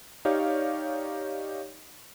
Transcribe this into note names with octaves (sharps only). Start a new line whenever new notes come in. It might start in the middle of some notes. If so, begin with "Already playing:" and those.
D#4 G4 C#5 D5 F5